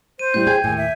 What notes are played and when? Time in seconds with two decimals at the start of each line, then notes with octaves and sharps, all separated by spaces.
0.19 C5 D#7
0.34 A2 G3 E4 G6
0.47 G#4 G5 G#6
0.64 D#2 A2 G#5
0.78 E5